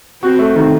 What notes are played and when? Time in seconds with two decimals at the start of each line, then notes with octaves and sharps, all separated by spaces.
0.22 C4 F#4
0.39 A3
0.56 D#3